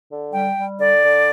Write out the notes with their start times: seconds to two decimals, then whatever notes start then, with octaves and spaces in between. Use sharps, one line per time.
0.10 D3
0.33 G3 G5
0.56 G3
0.79 D3 D5
1.03 D3